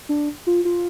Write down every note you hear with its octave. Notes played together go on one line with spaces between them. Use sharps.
D4
F4
F4